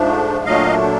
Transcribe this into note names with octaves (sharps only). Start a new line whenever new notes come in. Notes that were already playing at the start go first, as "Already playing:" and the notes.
Already playing: G#2 F3 A3 D4
A#2 F#3 A3 D4 D#5 F5